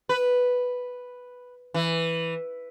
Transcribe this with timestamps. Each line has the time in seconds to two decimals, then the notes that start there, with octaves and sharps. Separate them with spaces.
0.09 B4
1.74 E3